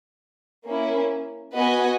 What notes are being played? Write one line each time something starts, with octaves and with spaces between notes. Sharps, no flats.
A#3 C#4 E4
B3 F#4 B4 D#5 G#5